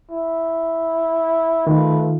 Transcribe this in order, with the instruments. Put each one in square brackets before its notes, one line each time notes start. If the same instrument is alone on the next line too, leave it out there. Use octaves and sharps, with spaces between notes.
[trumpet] E4
[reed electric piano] D#3 [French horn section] A3 F4 [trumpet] B4